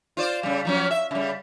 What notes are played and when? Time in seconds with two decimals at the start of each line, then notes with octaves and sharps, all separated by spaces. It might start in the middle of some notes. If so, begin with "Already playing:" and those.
0.17 F4 C5 D5
0.43 C#3 G3
0.65 F3 F#3 C#4
0.91 E5
1.11 C#3 G3